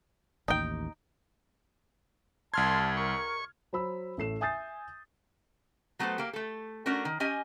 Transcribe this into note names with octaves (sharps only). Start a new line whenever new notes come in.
A1 D#2 D#4 G5
C2 A5 C6 F6 G#6
A#4 C#6
F#3 C5 B5 E6
A1 A3 C7 E7
E5 G#5 D#6 G6 A6 C7
F#3 A3 B3 G#4 A4 C5
A#3 G4
A3 A4
A3 C#4 D4 F#4 A#4
D#3
C#4 G4 D#5 G#5